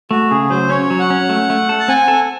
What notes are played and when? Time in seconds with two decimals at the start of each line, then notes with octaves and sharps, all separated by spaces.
0.11 A3 F#4
0.30 C#3 G#4
0.50 F#3 C5
0.70 C#4 C#5
0.90 F#3
1.00 F#5
1.10 C#4
1.29 A3
1.50 A3
1.69 A4
1.80 A5
1.88 C4 G#5
2.08 A4